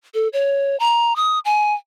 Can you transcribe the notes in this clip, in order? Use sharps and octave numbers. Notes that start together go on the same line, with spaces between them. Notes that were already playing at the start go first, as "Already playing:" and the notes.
A4
C#5
A#5
D#6
G#5